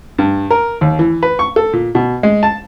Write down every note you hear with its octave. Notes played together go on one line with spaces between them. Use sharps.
G2
A#4
D#2
E3
B4
C#6
A4
A#2
B2
G#3
A5